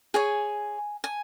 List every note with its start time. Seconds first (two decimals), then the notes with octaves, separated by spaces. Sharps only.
0.14 G#4 C#5 G#5
1.04 G#5